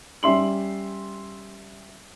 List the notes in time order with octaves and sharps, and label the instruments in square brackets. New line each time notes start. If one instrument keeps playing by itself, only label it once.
[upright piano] G3 C#4 E5 C6 F#7